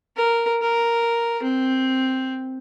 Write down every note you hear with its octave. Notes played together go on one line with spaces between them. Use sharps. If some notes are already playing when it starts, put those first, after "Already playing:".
A#4
A#4
C4